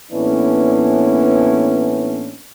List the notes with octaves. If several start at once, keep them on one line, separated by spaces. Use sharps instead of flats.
A2 E3 A#3 B3 C#4 D4